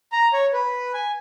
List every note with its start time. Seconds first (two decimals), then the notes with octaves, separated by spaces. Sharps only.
0.12 A#5
0.33 C#5
0.53 B4
0.94 G#5